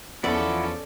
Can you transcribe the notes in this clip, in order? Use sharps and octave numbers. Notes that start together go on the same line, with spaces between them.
E2 F3 B3 C#4 E4 A4 D5